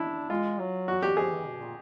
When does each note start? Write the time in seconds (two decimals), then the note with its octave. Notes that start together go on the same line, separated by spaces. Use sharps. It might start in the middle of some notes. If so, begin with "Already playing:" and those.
Already playing: D4 E4
0.30 G#3 F4
0.59 F#3
0.88 F#4
1.02 G4
1.17 F3 G#4
1.31 E3
1.46 B2
1.61 A#2